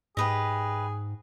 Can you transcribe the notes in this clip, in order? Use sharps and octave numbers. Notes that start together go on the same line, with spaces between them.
G#2 G4 G#4 B4 D#5